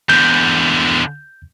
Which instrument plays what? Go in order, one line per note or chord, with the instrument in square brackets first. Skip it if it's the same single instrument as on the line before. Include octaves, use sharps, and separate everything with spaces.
[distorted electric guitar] E2 D3 [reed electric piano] G6